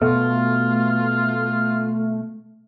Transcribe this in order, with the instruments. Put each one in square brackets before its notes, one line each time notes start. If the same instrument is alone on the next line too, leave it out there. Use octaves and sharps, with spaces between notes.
[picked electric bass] B2 B3 [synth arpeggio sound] A3 [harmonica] F4 F6